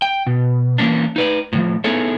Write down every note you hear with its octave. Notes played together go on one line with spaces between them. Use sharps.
G5
B2
E3 A#3 C#4 D4
D#4 B4 D5
A2 C3 F3
B3 D#4 E4 G#4 A4 C#5